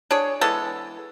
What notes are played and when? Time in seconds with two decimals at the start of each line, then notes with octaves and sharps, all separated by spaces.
0.11 D4 G#4 C#5
0.41 E3 G#3 B3 A4